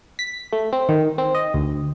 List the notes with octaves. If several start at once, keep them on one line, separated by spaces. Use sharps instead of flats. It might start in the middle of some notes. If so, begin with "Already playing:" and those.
B6
A3
C4
D#3
C4
D#5
D2